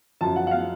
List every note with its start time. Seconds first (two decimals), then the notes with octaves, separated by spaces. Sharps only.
0.21 F#2 F3 A5
0.36 F#5
0.47 F#5
0.51 F5